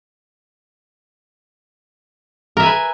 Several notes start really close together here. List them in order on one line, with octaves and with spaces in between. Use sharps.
A#4 E5 G#5 B4